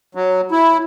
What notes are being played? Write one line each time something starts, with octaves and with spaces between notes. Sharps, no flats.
F#3
E4